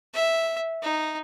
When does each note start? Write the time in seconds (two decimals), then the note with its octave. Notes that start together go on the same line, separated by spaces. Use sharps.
0.14 E5
0.82 D#4